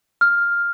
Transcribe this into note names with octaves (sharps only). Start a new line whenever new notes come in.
F6